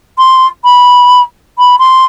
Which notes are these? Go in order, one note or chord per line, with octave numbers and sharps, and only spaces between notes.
C6
B5
B5
C6